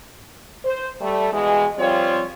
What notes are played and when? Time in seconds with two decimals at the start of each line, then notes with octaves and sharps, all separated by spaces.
0.65 C5
1.01 G3 A3
1.33 B2 E3 G#3
1.78 F3 G3 C4 F4 C#5